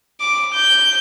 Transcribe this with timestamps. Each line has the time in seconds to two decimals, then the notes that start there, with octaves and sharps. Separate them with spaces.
0.21 D6
0.54 G6